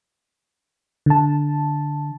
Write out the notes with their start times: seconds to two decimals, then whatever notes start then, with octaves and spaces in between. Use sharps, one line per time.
1.06 D3 A5